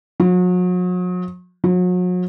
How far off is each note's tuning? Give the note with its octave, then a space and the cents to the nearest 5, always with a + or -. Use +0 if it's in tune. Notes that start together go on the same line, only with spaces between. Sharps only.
F#3 -40
F#3 -40